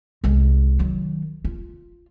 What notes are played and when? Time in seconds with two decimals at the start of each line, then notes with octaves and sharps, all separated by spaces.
0.24 C2 G#3
0.79 D#3 F#3
1.44 F4